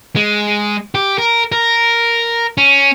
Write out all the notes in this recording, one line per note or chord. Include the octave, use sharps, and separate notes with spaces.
G#3
G4
A#4
A#4
C#4